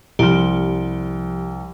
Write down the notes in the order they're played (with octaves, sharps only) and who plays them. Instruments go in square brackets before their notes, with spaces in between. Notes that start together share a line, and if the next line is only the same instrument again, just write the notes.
[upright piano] C2 [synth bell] F3 G4